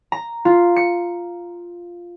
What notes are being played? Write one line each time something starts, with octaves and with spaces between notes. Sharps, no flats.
A#5
F4
C#7